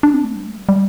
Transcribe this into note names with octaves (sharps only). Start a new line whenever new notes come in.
D4
C4
A3
G3
A3
G3
G3